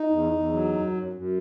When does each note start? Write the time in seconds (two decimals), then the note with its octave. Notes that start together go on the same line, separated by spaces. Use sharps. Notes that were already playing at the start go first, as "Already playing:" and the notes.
Already playing: D#4
0.10 E2
0.31 E2
0.52 F#3
0.72 F#2
0.92 F#2
1.13 F#2